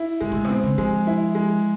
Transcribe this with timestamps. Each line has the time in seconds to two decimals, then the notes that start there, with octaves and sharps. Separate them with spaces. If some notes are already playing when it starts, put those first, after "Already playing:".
Already playing: E4
0.20 G#2 G#3
0.32 A#2
0.35 A2
0.44 C3
0.49 B2 C4
0.63 C#3
0.78 F3 G#3
1.07 E4
1.35 G#3